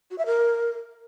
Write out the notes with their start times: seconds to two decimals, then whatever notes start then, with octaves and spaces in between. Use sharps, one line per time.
0.11 F#4
0.18 E5
0.26 A#4